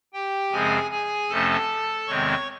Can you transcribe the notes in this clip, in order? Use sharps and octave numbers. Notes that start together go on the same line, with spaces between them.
G4 G5
F#2 C#3 F3 G#3 C4 G#4 G#5
G#4 G#5
F2 C3 F3 A3 C#4 A4 A5
E2 C3 D#3 G#3 C4 C#5 C#6